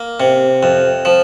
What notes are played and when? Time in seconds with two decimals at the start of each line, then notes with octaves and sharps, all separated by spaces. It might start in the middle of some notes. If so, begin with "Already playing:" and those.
Already playing: A#3
0.20 C3
0.63 F2
1.05 F3